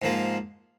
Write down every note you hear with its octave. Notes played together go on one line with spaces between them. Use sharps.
G#2 F3 A#3